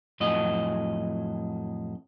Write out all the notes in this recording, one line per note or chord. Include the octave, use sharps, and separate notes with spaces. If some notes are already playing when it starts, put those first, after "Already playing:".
F2 A2 F#3 D#5